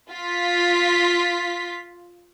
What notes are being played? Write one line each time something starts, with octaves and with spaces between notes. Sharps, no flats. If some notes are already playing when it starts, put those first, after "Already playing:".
F4 B6